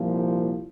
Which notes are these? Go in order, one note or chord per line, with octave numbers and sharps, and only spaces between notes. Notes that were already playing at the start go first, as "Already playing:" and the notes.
Already playing: C2 A#2 F3